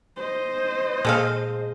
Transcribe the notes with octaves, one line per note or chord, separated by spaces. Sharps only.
C5 D#5
A#2 G#3 G#4 A4 F5